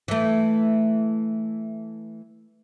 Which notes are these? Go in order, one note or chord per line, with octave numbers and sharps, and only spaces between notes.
E3 A3